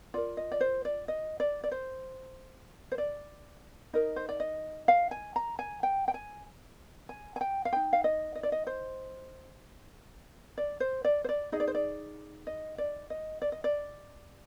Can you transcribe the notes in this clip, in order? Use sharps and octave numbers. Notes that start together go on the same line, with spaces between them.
F4 A#4 D5
D#5
D5
C5
D5
D#5
D5
D5
C5
C5
D5
D#4 A#4 D#5
C5
D5
D#5
F5
G#5
A#5
G#5
G5
G5
G#5
G#5
G#5
G5
F5
D#4 G#4 G5
F5
D#5
D#5
D5
D#5
C5
D5
C5
D5
C5
D5
D#4 G#4 D#5
D5
C5
D5
D#5
D5
D#5
D5
D#5
D5